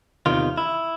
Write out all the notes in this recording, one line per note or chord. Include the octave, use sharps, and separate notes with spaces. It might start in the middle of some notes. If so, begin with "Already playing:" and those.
E2 C3 D#3 F4
E4